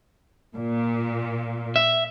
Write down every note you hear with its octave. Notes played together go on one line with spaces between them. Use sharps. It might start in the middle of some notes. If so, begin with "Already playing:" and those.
A#2
E5